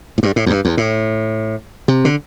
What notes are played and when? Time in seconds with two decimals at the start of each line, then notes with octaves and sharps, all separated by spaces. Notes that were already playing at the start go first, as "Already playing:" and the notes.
0.18 A2
0.23 G2
0.36 A2
0.46 E2
0.50 G2
0.65 E2
0.77 A2
1.88 C3
2.05 D3